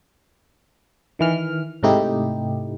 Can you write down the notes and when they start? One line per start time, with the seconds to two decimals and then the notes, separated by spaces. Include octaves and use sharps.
1.19 D#3 E3 F6
1.83 G#2 C3 A3 D#4 E4 G4